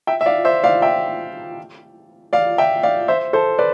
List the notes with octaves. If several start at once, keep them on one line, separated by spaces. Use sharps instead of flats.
E5 G5
E5
D5 F5
C5 E5
D5 F5
E5 G5
D5 F5
E5 G5
D5 F5
C5 E5
A4 C5
B4 D5